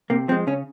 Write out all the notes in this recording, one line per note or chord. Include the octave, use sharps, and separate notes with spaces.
C3 A#3
F3 G#3 C4
C#3 C#4